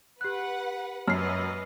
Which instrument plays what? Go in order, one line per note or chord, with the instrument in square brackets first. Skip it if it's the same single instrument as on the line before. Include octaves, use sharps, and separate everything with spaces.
[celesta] G4 F#6 [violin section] B4 F#5
[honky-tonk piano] F#2 [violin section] B4 D#5 [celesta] F6 C7